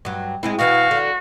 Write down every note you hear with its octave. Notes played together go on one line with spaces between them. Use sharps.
G2 F#3
G#3 C4 E4
B2 E3 F#4 F5
D3